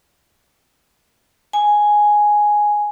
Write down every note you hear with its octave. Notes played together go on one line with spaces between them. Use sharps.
G#5